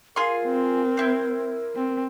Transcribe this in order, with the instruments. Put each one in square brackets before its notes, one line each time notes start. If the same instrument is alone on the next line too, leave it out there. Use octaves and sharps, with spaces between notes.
[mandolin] F4 G#4 C6 [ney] A#4
[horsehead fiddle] C4
[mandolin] E4 C5
[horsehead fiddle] C4